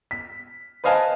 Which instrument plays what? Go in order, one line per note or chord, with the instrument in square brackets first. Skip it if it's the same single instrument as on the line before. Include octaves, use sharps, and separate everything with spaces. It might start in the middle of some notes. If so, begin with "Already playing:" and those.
[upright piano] B6
B4 C5 D#5 F5 G#5 A5